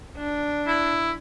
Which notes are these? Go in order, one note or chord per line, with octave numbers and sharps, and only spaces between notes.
D4
E4